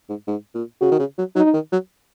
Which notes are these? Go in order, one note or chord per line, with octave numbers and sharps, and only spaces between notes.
G#2
G#2
A#2
C#3 F#4
D#3
C#3
F#3
F#3 D#4
D#3
F#3